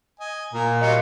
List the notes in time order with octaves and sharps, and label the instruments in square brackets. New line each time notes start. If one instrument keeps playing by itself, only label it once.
[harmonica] D#5 G#5
[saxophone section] A#2 [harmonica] A#4
[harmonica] F#3 G3 F4 [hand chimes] D#5 C#7